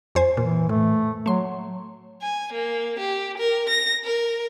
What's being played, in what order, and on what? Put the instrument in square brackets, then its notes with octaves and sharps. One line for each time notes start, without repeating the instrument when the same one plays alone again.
[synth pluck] F2 C5 G#5
[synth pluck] A#2 [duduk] E3
[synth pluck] A2 [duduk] A3
[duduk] F#3 [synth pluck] A3 C6
[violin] G#5
A#3
G4
A#4
A#6
A#4